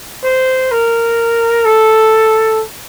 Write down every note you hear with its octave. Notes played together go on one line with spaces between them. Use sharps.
C5
A#4
A4